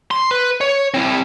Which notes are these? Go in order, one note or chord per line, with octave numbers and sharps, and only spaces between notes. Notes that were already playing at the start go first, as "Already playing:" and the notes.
C6
B4
C#5
C4 E4